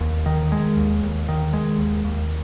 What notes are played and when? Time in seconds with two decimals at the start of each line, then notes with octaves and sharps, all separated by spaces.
0.01 D#2
0.26 D#3
0.52 G#3
0.77 D#2
1.03 D#2
1.29 D#3
1.53 G#3
1.79 D#2
2.05 D#2